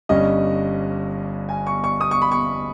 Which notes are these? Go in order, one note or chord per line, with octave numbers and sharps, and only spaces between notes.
G1 G2 G3 C#4 D#5
G#5
C#6
C#6
D#6
C#6
B5
C#6